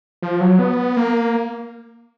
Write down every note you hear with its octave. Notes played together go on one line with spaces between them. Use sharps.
F3
F#3
B3
A#3